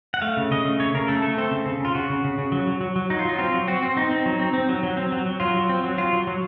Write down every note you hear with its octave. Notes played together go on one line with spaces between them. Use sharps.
F#5
A3 F5
C#3
C#3 D#5
A3
C#3 C#5
C#3 A#4
A3 A4
A3 A4
C4 A4
C#3
C#3
C#3 F4
C#3 F#4
C#3
C#3
C#3
F#3
F#3
F#3
F#3
F#3 D#4
F4
F#3 D#4
C4 F4
F#3
C4 F#4
C4
C4 D#4
C4
F#3
C4
C4
F#3
F#3
C4
F#3
F#3
F#3 F4
F#3
C4
F#3
F#3 F4
F#3
F#3